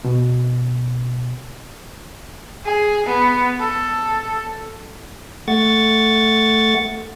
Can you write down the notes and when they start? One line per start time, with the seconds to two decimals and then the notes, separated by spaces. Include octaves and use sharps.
0.04 B2
2.65 G#4
3.06 B3
3.60 A4
5.48 A3 F#5 C#6 A6